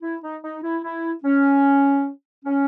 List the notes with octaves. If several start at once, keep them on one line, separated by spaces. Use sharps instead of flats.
E4
D#4
D#4
E4
E4
C#4
C#4